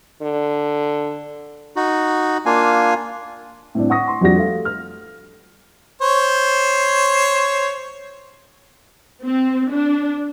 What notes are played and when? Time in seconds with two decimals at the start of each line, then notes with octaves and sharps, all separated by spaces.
0.22 D3
1.76 D#4 F#4
2.46 A#3 D4 F4 F5 G#5
3.75 A2 C4 D4
3.90 F#5 C#6 D#6 A#6
4.07 C6
4.21 F2 G3 D4 F#4 A#6
4.35 A3 F5
4.65 F6
6.02 C5 C#5
9.25 C4
9.72 D4